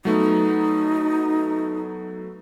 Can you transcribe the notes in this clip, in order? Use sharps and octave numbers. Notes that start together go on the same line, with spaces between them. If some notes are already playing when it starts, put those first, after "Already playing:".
F#3 A3 B3 D#4